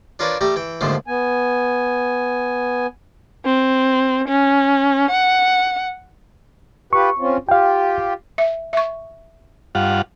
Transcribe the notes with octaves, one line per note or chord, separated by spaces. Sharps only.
D4 F4 A#4 B4 C#5 D5
G3 A3 G4 A#5
E3 G5
D#2 G#2 D3 F3 A3
B3 G#5
C4
C#4
F#5
F4 G4 B4 C#6
C4 C#4 F4
F4 G4 F5 G5
E5
E5 C#6
G2 F4 F#5